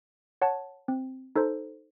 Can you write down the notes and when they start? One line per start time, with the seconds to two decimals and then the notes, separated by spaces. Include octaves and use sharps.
0.42 C#5 F#5 A5
0.88 C4
1.36 D#4 A4 C5